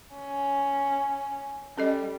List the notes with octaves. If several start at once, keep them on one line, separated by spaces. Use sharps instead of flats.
C#4
G3 C#4 A4 D#5